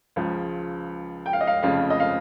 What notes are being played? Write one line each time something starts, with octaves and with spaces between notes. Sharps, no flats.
C#2 C#3 F3
G5
F5
D#5
F5
F1 F2 C#3 F3 F5
D#5
F5